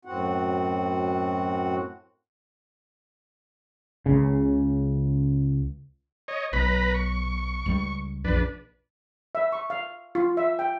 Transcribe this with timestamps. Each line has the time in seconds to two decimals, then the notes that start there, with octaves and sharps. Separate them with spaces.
0.05 F#2 A2 C4 F#4 F#5
4.06 C#2 C#3
6.28 C#5 D#5
6.53 B1 B4 A#5 B5
6.94 C#6
7.66 C#2 G3
8.25 A#1 F2 D4 B4
9.35 E5
9.52 C#6
9.70 F5
10.15 F4
10.37 E5
10.59 G5